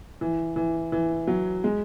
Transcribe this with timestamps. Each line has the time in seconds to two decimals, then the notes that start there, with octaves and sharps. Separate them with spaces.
0.21 E3
0.56 E3
0.92 E3
1.27 F#3
1.64 G#3